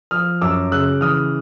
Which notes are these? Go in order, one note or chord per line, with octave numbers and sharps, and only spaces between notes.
F3 D#6 F6
F#2 D6 E6
C#3 E6 F#6
E3 D#6 F6